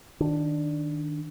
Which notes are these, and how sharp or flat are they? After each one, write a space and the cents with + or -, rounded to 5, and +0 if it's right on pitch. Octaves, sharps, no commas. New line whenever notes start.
D#3 -10 D4 +0